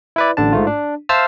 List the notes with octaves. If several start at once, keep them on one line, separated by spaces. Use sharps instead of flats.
E4 B4 D5
A1 D3 D4 A5
G#2 A3 F4
D4
C5 E5 F5 A5 E6 F6